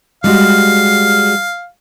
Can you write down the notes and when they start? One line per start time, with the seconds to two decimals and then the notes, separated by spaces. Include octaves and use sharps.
0.24 G3 G#3 F#4 F5